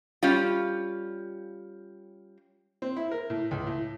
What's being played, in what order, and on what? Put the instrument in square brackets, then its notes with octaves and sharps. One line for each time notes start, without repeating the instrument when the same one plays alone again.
[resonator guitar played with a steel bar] G3 C#4 F4
[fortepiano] C4
E4
A#4
A2
C#2
A2